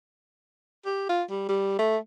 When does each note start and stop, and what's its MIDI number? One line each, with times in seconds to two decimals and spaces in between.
0.86 1.09 67
1.09 1.23 65
1.30 1.46 55
1.49 1.76 55
1.79 1.97 57